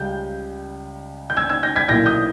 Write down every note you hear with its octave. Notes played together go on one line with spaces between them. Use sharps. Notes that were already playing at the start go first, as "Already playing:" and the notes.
Already playing: C#2 C#3 G3 G6
G6
E6 G#6
E6 G#6
G6 A#6
G#6 B6
B1 A#2 A#3 E4 G6 A#6
D#6 G6